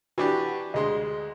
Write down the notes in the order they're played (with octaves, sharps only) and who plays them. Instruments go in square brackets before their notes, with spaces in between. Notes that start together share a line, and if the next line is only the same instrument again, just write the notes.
[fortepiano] E3 D4 G4 [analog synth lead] F#4
[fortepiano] D2 G#3 C6 [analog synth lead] D#5